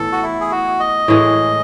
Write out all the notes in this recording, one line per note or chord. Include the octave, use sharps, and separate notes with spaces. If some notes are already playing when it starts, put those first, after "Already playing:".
Already playing: A2 E3 B3 A4
F#4
E4
G#4
F#4
D#5
A2 E3 G#3